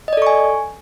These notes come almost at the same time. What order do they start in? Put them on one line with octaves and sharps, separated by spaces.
D#5 D5 A4 C#6 G#5